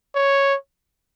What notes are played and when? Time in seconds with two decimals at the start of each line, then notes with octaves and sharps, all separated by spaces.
0.15 C#5